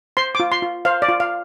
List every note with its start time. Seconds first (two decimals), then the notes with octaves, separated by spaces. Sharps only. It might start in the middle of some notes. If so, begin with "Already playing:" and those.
0.17 C5 C6
0.35 F4 D6
0.52 C6
0.62 F4
0.85 C5 F5
1.02 D5
1.08 F4
1.20 F5